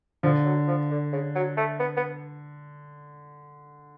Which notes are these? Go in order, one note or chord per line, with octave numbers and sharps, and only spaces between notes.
D3 F3
F#3
F3
D3
C#3
F#3
A3
B3
B3